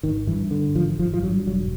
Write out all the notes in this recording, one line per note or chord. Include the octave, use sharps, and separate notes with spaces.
G#1 D#3
G2 E3
D3
G#1 F3
G#1 F3
F3
G2 F#3
E1 F#3